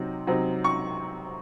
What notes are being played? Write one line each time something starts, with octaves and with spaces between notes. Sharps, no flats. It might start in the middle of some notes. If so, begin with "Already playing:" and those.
Already playing: C3 F#3 C4 D#4
C3 F#3 C4 D#4
C#6